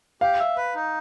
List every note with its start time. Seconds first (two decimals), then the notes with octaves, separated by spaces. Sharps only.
0.21 G4 F5
0.39 E5
0.57 B4
0.75 D#4